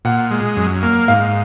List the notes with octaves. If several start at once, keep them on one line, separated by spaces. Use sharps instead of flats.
A#2 F#5
G#3
F#2
A#3
G#2 F5